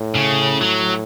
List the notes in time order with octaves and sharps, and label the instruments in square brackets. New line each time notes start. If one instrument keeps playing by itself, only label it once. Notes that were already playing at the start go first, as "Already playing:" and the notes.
Already playing: [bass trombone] A2
[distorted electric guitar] C#3
F#3